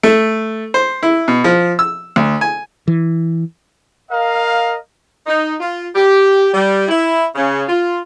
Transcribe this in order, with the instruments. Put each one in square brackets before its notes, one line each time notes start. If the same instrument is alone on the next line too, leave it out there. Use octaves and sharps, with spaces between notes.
[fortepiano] A3
C5
E4
B2
F3
E6
D2
G#5
[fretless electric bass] E3
[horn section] A#4 D#5 F5
D#4
F4
G4
G3
E4
C#3
F4